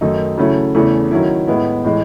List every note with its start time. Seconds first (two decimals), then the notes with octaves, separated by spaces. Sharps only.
0.01 F#2 D#3 A3 D#4
0.38 C#3 F#3 A3 C#4 E4
0.75 E2 C#3 E3 A3
1.11 D#3 F#3 C#4 E4
1.48 A2 G#3 B3 E4
1.84 A2 E3 G#3